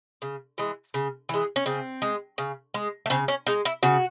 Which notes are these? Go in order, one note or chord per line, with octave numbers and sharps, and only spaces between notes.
C#3
E3 G#3
C#3
E3 G#3
C#4
C#3 C4
G#3
C#3
G#3
A3
C#3 C4
C#4
G#3 D#4
E4
C#3 F#4